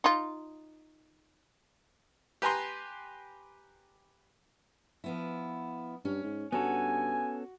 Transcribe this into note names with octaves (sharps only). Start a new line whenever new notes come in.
D#4 F4
G4 B4 G#5 A#5 C6
F3 B3 E4
G2 C#4
G#2
G2 B3 C#4 F#4 A4 G#5